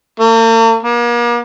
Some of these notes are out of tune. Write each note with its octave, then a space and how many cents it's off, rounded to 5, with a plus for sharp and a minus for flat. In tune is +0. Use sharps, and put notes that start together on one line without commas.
A#3 -45
A#3 +40